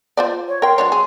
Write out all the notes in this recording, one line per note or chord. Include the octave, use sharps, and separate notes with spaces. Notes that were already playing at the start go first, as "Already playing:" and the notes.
F4 C5 D5
C#5
A#4 G5 C6
F#3 D4 C#5
G#4